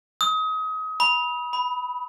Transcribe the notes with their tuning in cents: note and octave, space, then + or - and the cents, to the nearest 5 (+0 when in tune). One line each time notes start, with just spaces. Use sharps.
D#6 +30
B5 -25
B5 +5